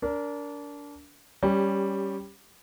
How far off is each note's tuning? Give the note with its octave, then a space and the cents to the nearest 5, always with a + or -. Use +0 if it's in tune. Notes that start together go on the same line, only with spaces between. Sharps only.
D4 -25 A#4 +0
G3 +0 C#4 +0 G4 +20